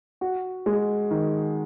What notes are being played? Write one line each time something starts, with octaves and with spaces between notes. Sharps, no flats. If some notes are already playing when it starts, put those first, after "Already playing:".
F#4
G#3
D#3